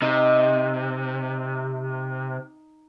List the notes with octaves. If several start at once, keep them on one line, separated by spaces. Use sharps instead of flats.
C3 D#4